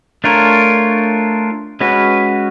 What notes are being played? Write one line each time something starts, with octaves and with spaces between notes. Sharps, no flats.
A3 D4 F4 A#4 C#5
G#3 C#4 F#4 B4